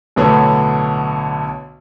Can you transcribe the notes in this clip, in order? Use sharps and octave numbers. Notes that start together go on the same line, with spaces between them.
B1 A2 D3 B3 C#5